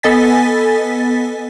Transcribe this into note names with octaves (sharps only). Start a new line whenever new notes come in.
B3 A4 D#5 G#5 A6 B6